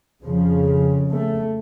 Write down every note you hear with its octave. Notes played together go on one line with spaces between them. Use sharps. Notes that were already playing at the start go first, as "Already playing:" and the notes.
F2 C#3 F3
A3